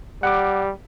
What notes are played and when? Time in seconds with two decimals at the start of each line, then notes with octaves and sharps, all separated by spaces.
0.23 G3 F#5 D6